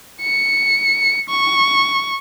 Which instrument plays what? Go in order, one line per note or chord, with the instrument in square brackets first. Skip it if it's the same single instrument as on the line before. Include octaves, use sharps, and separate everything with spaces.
[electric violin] C#7
C#6